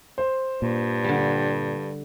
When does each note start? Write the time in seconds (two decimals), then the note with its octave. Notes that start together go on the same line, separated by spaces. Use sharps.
0.18 C5
0.62 G2 A#2
1.04 D3 G3